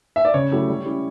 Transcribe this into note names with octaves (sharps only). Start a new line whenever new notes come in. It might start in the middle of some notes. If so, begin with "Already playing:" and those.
E5
D5
C#3 C#5
F#3 A3 E4 G4
G3
C#4 E4 G4